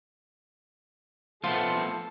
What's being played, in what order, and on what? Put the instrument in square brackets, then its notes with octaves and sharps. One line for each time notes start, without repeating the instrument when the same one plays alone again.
[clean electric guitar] F3 A3 B3 [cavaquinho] F4 [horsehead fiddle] A4